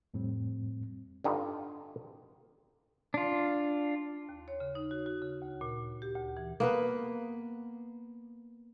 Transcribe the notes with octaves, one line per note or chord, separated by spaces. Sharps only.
F2 A2 G3 C4
G2 D3 D#4 F4
D4 F4
D#2
C#5
C#3
D#4
F#4
F#4
C#3
D2
A#2
G4
D2
E3
A#3 B3 B4